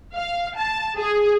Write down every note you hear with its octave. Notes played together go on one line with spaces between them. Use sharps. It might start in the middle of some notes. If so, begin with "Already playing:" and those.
F5
A5
G#4